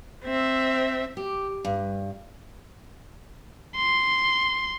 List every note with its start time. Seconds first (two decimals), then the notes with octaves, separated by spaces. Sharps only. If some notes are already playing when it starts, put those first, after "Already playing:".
0.25 C4 E5
1.17 G4
1.65 G2
3.76 C6